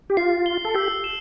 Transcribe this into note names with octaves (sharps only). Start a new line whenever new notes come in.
G4
F4 C7
G7
A4
G4 E6
E7